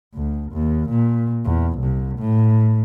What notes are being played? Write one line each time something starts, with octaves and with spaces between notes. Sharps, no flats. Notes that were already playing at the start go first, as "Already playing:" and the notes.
D2
D#2
A#2
E2
C2
A2